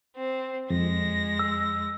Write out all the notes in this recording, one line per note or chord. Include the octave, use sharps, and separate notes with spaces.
C4
F2 G#3 A#6
E6